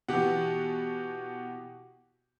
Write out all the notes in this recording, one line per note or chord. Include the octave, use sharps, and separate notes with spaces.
B2 E3 G4 F#5